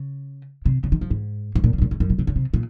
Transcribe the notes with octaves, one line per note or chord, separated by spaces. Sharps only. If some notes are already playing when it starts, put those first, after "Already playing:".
Already playing: C#3
C3
C#3
D#3
F3
G#2
G#2
A#2
C#3
G#2
A#2
G#2
F#2
A#2
C3
C#3
C3
A#2